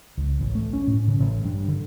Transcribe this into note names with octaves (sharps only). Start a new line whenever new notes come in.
C#2
A1
A3
C#4
A2
C#3
A1
G2
D3